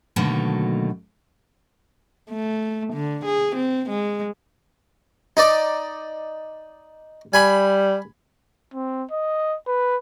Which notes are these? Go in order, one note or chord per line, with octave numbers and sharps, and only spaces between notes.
B2 D3 D#3 F#3 A3 A#3
A3
D3
G#4
C4
G#3
D#4 D5
G3 G#5 B5
C4
D#5
B4